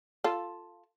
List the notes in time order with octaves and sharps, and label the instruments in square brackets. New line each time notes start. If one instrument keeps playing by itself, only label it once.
[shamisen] F4 A4